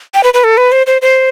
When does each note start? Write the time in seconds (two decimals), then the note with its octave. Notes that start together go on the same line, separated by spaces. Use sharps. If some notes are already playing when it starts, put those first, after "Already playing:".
0.14 G5
0.24 B4
0.34 B4
0.44 A4
0.57 B4
0.72 C5
0.87 C5
1.02 C5